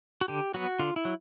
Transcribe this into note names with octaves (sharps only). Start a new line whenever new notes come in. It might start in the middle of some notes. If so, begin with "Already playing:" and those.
F#4
D3 G4
F#3 B3 F#4
D3 F4
E4
F#3